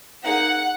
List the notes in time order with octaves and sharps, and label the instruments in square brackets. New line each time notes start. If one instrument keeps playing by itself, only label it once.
[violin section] A#3 D#4 G#4 F#5